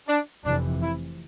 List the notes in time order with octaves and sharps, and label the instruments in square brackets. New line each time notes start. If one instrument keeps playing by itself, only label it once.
[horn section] D4
[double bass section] F1 F2 C3 E3 [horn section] D4
[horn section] E4